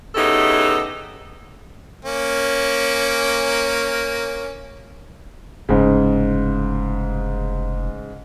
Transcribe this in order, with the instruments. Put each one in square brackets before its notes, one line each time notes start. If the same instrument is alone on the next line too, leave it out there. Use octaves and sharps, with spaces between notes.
[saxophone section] C#3 B3 D#4 E4 G4 A4
[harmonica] A#3 C#4
[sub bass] F1 [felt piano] G#2 C#3